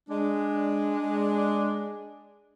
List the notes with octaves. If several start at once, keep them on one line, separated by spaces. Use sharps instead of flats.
G#3 D4